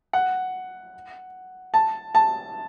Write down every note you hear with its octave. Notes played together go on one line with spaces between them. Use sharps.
F#5
A5
A5